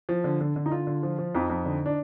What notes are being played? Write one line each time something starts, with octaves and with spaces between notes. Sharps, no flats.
F3
D3
D3
D3
D#4
D3 F4
D3
F3
F3
F2 D#4
F2
D3
D4